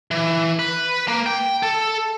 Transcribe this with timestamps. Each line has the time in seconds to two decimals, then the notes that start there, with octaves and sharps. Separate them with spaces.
0.11 E3
0.59 B4
1.08 A#3
1.26 G5
1.63 A4